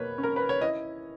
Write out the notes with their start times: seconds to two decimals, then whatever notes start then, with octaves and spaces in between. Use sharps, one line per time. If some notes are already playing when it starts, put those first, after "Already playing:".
Already playing: B2 A#3 B4 C#5
0.18 C#4
0.23 A#4
0.36 B4
0.49 C#5
0.61 E4 D#5